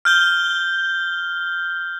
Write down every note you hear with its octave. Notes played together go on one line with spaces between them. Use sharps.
F6 G6 G7